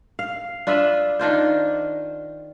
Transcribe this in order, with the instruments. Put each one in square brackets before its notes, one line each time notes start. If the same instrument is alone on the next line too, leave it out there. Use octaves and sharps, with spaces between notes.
[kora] F5
D4 F4 B4 E5
D#3 D4 F4 C5